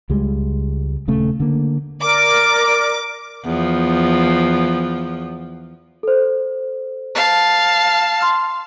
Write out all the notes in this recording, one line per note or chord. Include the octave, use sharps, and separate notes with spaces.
C#2 G3 G#3
D#1 C#3 A3
D3 A#3
A#4 D5 D6
E2 F3
A4 C5
F5 A5
C6 F6